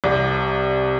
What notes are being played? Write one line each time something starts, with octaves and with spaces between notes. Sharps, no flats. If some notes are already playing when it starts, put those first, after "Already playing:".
C2 C3